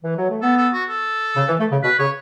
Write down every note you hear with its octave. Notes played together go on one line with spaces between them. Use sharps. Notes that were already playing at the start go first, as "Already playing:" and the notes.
E3
F#3
A3
B3 A4
A4
F#4
A4
C#3
E3
A3
C#3
B2 B4
C#3 C#5